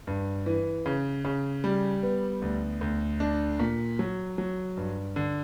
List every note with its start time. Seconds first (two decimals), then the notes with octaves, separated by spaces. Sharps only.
0.07 G2
0.46 E3
0.86 C#3
1.25 C#3
1.64 G3
2.03 B3
2.42 D2
2.81 D2
3.20 D4
3.59 A#2
3.99 F#3
4.38 F#3
4.77 G2
5.16 D3